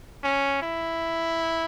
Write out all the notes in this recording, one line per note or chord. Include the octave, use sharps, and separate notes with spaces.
C#4
E4